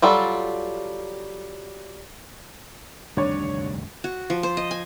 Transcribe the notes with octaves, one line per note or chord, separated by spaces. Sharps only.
F#3 G3 F4 A4
F1 D2 G2 C3 D#3 G3 D4 C#5
F#4
F3
C5
D#5
G#5